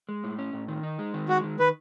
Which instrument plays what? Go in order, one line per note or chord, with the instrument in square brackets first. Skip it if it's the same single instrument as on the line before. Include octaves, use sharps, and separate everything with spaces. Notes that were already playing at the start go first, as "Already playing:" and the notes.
[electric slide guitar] G#3
A2
C#4
A2
D#3
D#4
G#3
D#3
[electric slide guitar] G#3 [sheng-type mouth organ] F#4
[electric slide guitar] D#3
[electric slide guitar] D#3 [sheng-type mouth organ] B4